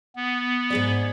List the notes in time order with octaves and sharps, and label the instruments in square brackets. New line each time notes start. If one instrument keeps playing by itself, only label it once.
[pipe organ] B3
[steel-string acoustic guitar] G#2 G#4 D5